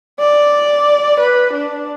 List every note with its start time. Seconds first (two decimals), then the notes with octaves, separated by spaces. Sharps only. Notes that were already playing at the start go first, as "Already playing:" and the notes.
0.19 D5
1.20 B4
1.54 D4